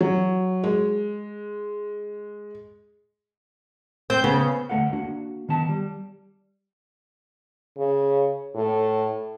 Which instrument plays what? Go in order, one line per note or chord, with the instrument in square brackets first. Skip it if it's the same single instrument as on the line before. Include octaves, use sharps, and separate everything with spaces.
[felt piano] F#3
G#3
[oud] C4 [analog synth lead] G6
[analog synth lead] C#3 [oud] B3
[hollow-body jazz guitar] D2 A3 A4 F5 F#5
A#3 D4 F#4
D#3 B3 A5
G3
[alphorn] C#3
A2